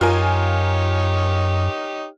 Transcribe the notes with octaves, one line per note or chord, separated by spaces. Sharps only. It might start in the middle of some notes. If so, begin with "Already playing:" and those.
F#2 D#4 F4 G4 A#4 C#5 G#5